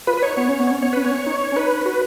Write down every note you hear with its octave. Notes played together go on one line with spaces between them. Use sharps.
F4 B4
B4
D#4 C#5
B3 C#5
C#4
B3
C#4 C#5
B3 C#5
C#4 B4
B3 C#5
C#4
D#4
C#4
D#4 B4
F#4 B4